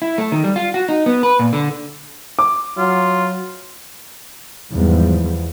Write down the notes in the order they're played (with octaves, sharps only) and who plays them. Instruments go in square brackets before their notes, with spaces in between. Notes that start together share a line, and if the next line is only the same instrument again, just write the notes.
[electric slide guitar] E4
A3
D#3
G3
F4
F#4
D#4
B3
B4
A#2
D3
[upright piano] D6
[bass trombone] F#3 [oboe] F4
[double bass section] E2 G#2 E3 F3 G3 B3